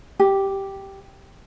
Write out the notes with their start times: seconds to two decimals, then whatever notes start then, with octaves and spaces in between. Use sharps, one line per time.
0.19 G4